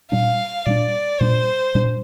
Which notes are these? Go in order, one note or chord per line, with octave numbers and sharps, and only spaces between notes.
A#2 G3 D4 F5
A#2 G3 D4 D5
A#2 G3 D4 C5
A#2 G3 D4